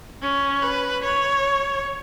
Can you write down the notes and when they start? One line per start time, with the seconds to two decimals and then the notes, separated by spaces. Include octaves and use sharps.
0.22 C#4
0.62 B4
1.04 C#5